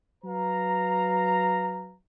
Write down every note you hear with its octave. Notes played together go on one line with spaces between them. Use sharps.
F#3 B4 F5 A#5